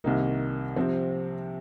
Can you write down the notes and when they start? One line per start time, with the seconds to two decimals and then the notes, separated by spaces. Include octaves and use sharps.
0.04 C2 C3 D#3 A#3 D#4
0.76 C3 F3 C4